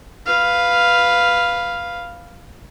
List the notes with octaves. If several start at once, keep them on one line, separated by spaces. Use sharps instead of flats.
B4 F5